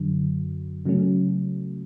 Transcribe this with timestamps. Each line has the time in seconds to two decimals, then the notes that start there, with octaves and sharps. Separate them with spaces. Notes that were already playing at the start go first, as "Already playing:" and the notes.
Already playing: F#2 D3 F#3
0.85 C#3 F#3 A3 C#4